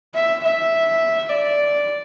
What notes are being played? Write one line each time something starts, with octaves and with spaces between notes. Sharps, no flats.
E5
E5
D5